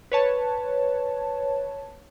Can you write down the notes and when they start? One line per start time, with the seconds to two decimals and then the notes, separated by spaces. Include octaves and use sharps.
0.12 B4 C#5 A5